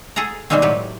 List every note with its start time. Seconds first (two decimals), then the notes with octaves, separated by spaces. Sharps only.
0.16 G#4 A4 F#5 A#5
0.50 B2 D#3 G3 G#3 A#3 C4
0.62 A2 F#3 G4 B4